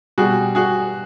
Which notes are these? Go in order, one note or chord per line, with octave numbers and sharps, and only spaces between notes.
B2 G3 F#4 G#4
F#4 G#4